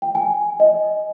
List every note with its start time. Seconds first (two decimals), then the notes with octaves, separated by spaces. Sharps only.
0.02 G5
0.15 G#5
0.60 D#5